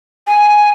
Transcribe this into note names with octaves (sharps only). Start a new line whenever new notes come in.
G#5